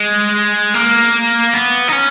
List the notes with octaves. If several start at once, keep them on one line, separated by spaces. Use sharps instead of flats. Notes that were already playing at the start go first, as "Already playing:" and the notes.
Already playing: G#3
A#3
B3
D#4
C#4